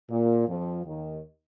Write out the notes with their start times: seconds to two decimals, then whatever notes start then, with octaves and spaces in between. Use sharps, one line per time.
0.09 A#2
0.47 F2 F3
0.84 D#2 D#3